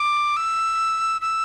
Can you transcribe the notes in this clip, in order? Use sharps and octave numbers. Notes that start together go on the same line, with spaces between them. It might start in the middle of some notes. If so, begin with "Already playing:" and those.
Already playing: D6
E6
E6